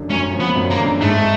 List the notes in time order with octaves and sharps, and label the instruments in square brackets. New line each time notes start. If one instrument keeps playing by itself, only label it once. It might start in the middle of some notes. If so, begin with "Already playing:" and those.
Already playing: [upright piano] F#2 D3 F3
[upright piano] F#2 [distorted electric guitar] C#4
[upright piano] F3
[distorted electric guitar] B3
[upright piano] F#2
[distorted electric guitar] A#3
[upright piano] D3
[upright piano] G#2 [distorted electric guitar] A3